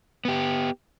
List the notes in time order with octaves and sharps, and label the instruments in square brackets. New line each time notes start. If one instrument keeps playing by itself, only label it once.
[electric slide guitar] B3 G4